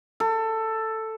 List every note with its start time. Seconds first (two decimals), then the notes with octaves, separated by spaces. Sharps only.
0.20 A4